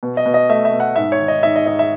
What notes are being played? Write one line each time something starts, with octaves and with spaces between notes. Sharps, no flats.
B2
D#5
B2
D#5
A3 E5
E5
B2
F#5
G#2 E5
C#5
D#3
D#5
G#2 E5
D#5
G#2 D#5
E5